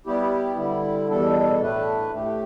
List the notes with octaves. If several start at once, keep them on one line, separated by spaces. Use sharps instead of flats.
G3 B3 E4 G4
D3 G3 E4
E2 B2 G3 D4 A4
A2 A3 D4 B4
A2 A3 G4